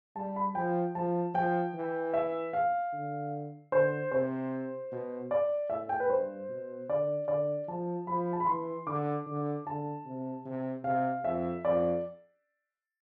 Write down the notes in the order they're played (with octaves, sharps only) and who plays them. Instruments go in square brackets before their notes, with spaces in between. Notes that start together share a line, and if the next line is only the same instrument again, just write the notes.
[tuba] G3 [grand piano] A5
[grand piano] B5
[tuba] F3 [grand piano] G5
[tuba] F3 [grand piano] A5
[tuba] F3 [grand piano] G5
[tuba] E3
[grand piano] E5
F5
[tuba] D3
[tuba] D3 [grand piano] C5
[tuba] C3 [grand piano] C5
[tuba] B2
[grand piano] D5
[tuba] A2 [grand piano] E5
[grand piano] G5
B4
[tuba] G2 [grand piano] C5
[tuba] B2
[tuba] D3 [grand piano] D5
[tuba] D3 [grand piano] D5
[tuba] F3 [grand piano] A5
[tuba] F3 [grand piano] B5
[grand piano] A5
B5
[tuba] E3 [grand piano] C6
[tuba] D3 [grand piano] D6
[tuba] D3
[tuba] D3 [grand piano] A5
[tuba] C3
C3
[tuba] C3 [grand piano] F5
[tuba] F2 [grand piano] E5
[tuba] F2 [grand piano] D5